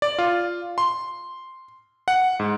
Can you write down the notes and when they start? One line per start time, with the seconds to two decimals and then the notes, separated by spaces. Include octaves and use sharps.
0.02 D5
0.19 F4
0.78 C6
2.08 F#5
2.40 G#2